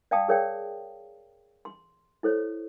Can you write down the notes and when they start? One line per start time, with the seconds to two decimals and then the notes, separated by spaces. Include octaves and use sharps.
0.11 D5 F5 G5 A5 D#6
0.28 G#4 A#4 C#5 D5 F5 G5
1.65 C6
2.23 E4 A4 C5 C#5